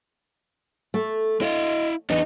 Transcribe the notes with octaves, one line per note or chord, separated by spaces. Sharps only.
A3
E4 D#5 F5
E2 D4 D#4 D#5